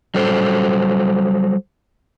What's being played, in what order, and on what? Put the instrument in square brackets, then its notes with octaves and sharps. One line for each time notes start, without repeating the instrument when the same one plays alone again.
[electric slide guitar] F#3 G3 A4 C5